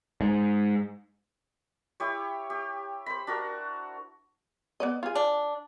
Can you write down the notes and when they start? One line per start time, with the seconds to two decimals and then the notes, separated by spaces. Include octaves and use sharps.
0.21 G#2
2.00 E4 G4 C#5
2.50 G4
3.06 C5 B5
3.27 D4 F#4 A#4
4.80 B3 D5 D#5
5.03 F4 G#4
5.15 D4